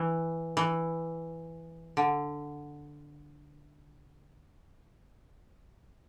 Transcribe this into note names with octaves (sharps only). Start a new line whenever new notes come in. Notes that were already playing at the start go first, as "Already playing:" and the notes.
Already playing: E3
E3
D3